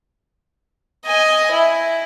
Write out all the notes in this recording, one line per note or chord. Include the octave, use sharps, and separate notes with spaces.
D#5 G#5
E4